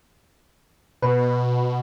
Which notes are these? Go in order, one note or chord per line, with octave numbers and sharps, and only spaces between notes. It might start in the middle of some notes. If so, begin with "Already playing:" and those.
B2 B4